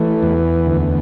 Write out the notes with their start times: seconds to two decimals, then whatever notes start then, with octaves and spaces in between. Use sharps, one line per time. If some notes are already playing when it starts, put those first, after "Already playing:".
Already playing: E3 A3
0.22 E2
0.66 D2